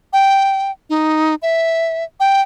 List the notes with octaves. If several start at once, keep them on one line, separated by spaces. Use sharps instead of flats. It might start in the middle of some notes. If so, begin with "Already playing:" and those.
G5
D#4
E5
G5